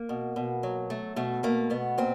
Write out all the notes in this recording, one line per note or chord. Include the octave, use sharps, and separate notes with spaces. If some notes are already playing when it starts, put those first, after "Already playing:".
Already playing: A#3
B2
B2
F#3
A3
B2 A3
A3 A#3
B2 B3
A#2 C4